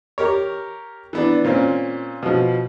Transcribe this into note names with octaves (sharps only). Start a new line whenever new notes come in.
G4 A#4 C#5
E3 B3 D4
A#2 C4 C#4
B2 F3